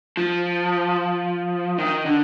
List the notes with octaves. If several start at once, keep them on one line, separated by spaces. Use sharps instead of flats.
F3
D#3
D3